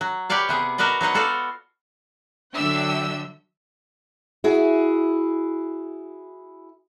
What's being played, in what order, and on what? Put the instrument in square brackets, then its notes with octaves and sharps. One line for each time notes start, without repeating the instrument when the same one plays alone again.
[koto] F#3
G4 B4 C#5 D5 F5
C3 B3 G#4
F#4 A#4 B4 D5 D#5
F#3 B3 D#4 F#5
F4 F#4 A4 D5 F5
[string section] D3 F#3 D4 E5 G5 E6
[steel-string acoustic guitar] E4 F#4 G#4